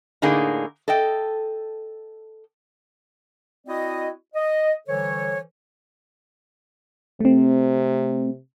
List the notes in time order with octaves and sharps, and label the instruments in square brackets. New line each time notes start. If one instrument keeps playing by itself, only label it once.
[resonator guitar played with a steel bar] A2 D3 A#3 D#4 G#4
A4 D#5 G5
[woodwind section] C4 E4 F#4 D5 D#5
D#5
D3 E3 G3 A4 C5 C#5
[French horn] C3 [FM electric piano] A3 C4